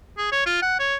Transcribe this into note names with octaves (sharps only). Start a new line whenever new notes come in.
G#4
C#5
F4
F#5
C#5